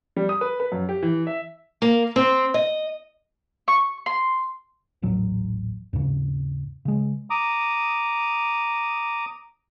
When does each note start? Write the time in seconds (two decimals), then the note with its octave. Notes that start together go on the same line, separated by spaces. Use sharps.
0.16 G3
0.29 D#6
0.41 B4
0.60 B4
0.72 F#2
0.89 G4
1.03 E3
1.27 E5
1.82 A#3
2.16 C4
2.54 D#5
3.68 C#6
4.06 C6
5.02 D#1 A1 F#3
5.93 D#2 G#2 C#3
6.85 C#3 G#3
7.30 A#5 D6 D#6